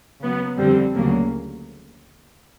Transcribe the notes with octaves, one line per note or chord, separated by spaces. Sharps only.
C#3 F#3 B3
F2 D3 G3 C4
D2 C#3 F#3 A#3